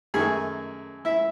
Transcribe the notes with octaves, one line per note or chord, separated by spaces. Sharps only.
F#2 D#3 A3 G#4 G#5
E4 E5